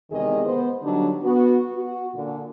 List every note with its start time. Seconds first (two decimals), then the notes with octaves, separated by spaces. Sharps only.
0.11 E2 C3 D#3 G#3 G#4 D#5
0.45 B3 C5
0.83 D3 F#3 G3 D4 D#4
1.24 B3 F#4
1.75 F#4
2.14 A#2 D3